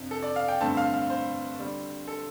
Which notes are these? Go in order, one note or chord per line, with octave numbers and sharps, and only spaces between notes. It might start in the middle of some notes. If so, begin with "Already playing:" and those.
Already playing: F2 C3 F3 D4
A4
D5
F5
G5
G2 D3 A3 C4 A5
F5
F5
C5
D3 G3 D4
A4